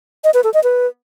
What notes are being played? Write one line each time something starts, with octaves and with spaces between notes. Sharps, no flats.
D#5
B4
A4
D#5
B4